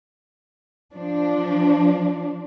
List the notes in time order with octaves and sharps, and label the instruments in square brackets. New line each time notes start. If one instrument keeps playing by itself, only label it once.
[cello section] F3 D4